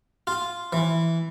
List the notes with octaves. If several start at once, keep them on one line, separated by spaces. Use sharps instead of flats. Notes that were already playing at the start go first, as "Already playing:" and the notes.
F4
E3